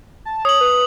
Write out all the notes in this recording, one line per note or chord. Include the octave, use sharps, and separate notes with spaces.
A5
C#5 D#6 F#7
B4